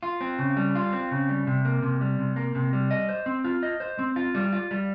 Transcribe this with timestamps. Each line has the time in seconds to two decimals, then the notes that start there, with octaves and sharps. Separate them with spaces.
0.03 F4
0.21 C4
0.39 C#3
0.57 G3
0.75 F4
0.93 C4
1.11 C#3
1.29 G3
1.47 C3
1.65 A#3
1.83 C3
2.01 G3
2.19 C3
2.36 A#3
2.55 C3
2.73 G3
2.91 D#5
3.09 C5
3.26 C4
3.44 F4
3.63 D#5
3.80 C5
3.99 C4
4.16 F4
4.35 G3
4.53 F4
4.71 G3